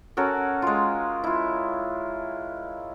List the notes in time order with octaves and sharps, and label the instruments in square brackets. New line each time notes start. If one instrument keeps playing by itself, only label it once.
[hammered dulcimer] C#4 F#4 A4 A#4
G#3 F4
E4 F4